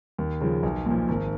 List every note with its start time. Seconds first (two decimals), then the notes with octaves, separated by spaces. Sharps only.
0.18 D#2
0.41 C#3 F3
0.63 B1
0.86 A#2 F3
1.09 G#1